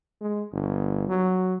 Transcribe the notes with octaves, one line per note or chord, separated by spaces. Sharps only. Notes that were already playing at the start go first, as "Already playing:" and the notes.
G#3
G1
F#3